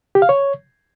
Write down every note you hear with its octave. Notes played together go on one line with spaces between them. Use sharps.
G4
F5
C#5